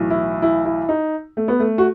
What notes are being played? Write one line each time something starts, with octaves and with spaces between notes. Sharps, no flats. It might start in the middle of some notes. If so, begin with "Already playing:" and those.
Already playing: B1 A2 E3
E4
E4
E4
D#4
A3
B3
A3
F#4